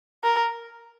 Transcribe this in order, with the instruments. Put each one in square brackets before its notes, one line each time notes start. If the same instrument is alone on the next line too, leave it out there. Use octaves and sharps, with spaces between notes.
[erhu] A#4